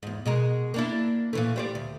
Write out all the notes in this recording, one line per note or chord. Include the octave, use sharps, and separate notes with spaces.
E2 G#2
B2 G#3 A#4
A#3 D4 E4
A#2 E3 A3
G3 C5 D5
D2